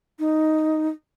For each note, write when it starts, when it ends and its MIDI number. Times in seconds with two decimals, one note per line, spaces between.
0.19 0.88 63